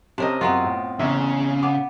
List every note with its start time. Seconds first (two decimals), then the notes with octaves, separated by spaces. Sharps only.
0.18 C3 C4 C#4 A#4 D#5 A5
0.41 F#2 C3 B3 C4 F4
0.64 A2
0.99 A1 E2 C#3 E5
1.63 B3 D6